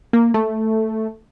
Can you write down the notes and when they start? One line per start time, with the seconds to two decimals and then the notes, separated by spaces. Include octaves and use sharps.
0.13 A#3
0.34 A3